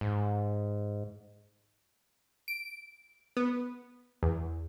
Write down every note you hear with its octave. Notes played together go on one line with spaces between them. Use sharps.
G#2
D7
B3
E2